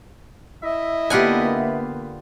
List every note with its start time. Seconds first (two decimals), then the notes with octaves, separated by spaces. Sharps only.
0.63 E4 D#5 E5
1.10 D3 A#3 B3 D4 F4 G4 F#5 G#5